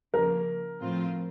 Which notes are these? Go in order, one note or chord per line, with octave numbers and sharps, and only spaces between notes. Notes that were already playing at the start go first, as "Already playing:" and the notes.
C#3 F3 A#3 A#4
A2 F3 C4 F4